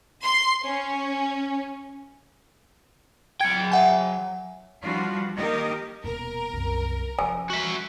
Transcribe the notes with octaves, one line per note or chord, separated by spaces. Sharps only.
C6
C#4
F#3 G5 G#6 C#7
E5 F#5 G#5
E3 F3 G3 D4 F4 F#4
D#3 A#3 D#4 G4 A#4 D#5
D#1 B2 A#4
C2 F#2
F3 C#4 G#5
F#4 E5